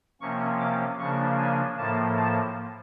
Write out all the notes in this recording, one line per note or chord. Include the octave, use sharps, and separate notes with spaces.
C3 F3 A#3 C#4 C#6
D6
C#3 F3 A#3 D4 C#6
G#5
A2 F3 A#3 A5
A5